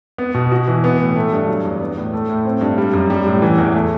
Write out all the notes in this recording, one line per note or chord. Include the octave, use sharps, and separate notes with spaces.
B3
B2
F#4
E3
B3
A2
A3
G2
F#3
E2
B3
A2
A3
A2
C4
G2
G3
F#2
G3
A2
E3
E2
A3